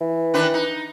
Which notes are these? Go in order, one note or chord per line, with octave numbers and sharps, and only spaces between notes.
E3
D#3 D4 B4
D#4